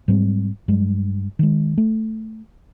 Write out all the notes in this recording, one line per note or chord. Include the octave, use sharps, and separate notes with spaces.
G#2 F#3 G3 C4
G2 F#3 G#3
D#3 G#3
A3